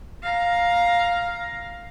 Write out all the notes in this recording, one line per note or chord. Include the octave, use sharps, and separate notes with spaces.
F5 A#5